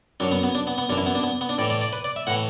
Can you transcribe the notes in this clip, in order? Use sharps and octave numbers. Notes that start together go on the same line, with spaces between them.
F#2 F#3 D4
B3
B3
D4
B3
B3
F#2 E3 D4
E4
B3
D4
B3
B3
D4
A2 E3 D5
D5
D5
B4
D5
E5
A2 E3 F#5